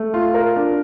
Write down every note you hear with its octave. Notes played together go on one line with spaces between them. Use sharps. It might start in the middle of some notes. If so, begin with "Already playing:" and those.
Already playing: A3
F4
A#4
D4